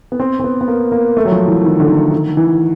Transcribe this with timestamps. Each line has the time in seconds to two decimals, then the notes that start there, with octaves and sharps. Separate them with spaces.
0.12 B3
0.20 C4
0.40 C4
0.44 B3
0.61 B3
0.68 A#3
0.92 A#3
1.17 A3
1.25 F#3
1.32 F3
1.48 E3
1.64 D#3
1.80 D3
1.88 D#3
2.12 D#3
2.37 E3